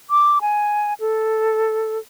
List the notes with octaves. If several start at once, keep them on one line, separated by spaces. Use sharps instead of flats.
D6
G#5
A4